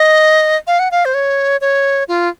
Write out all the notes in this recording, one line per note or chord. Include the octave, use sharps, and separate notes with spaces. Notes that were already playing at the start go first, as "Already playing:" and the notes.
Already playing: D#5
F5
F#5
F5
C5
C#5
C#5
F4